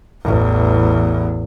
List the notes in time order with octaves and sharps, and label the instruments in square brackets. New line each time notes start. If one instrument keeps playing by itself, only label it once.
[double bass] A1 E2